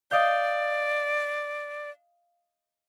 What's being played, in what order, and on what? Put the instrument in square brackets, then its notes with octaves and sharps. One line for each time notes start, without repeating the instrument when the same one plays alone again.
[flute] D5 [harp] D#5 F5 G6